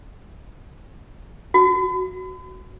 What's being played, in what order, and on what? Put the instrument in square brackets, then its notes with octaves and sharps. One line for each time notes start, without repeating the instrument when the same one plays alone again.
[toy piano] F#4